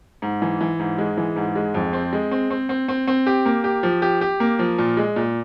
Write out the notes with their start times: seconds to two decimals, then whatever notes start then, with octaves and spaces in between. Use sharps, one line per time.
0.22 G#2
0.42 E3
0.61 E3
0.79 G#2
0.98 G#3
1.17 E3
1.36 G#2
1.55 G#3
1.74 F2
1.93 C4
2.13 G#3
2.31 C4
2.50 C4
2.69 C4
2.88 C4
3.07 C4
3.27 G4
3.46 A#3
3.64 G4
3.83 F3
4.02 G4
4.21 G4
4.40 A#3
4.59 F3
4.78 A#2
4.97 G#3
5.16 A#2